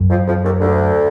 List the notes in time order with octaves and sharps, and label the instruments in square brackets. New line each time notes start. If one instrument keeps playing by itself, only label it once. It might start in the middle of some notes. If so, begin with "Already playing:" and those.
Already playing: [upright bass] F#2
[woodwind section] F2 F3
F2 F3
D#2 D#3
D2 D3